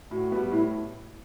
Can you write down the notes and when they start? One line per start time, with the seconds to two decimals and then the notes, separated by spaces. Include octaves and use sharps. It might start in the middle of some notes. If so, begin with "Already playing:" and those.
0.11 A2 F#4
0.32 G3 B3
0.52 A2 E4